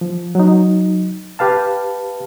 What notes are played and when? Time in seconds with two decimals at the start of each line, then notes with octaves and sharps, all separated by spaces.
0.01 F3
0.35 F#3 D#4
1.39 G4 B4 F5 A5